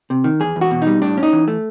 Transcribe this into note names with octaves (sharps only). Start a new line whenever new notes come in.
C3
D#3
E2 G#4
E2
F#4
B2
G3 D#4
A2 D4
C#4
D#4
E3
A3